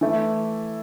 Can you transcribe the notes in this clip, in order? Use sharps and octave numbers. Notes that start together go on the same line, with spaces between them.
E3 A3 E4